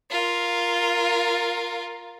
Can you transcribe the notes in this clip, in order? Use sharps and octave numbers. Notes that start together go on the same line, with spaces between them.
F4 A#4